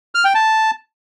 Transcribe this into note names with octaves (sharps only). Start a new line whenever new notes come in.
F6
G5
A5